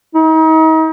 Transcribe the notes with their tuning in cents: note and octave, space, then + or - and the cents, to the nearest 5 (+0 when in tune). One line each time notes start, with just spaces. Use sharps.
D#4 +40